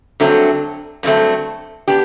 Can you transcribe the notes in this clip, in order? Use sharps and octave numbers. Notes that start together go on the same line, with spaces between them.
G2 D3 F#3 A3 C4
G2 D3 F#3 A3 C4
B3 D4 G4